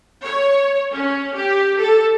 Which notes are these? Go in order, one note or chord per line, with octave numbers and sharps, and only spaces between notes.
C#5
C#4
G4
A4